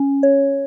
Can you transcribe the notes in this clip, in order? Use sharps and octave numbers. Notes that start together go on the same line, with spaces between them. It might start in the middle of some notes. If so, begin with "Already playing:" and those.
Already playing: C#4
C#5